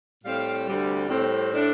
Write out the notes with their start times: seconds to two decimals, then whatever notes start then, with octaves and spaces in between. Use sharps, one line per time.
0.24 A2 G3 C4 F5
0.67 D2 C3 G3
1.10 A2 G3 C4
1.52 A2 A3 D4